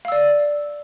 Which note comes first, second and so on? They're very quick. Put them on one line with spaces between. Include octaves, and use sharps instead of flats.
F5 E6 D5